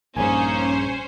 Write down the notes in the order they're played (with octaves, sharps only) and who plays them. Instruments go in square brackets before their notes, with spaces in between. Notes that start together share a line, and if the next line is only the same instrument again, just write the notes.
[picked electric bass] A#1 G2 [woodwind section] A#3 D#4 G#4 [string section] C#4 C5 [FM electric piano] G#5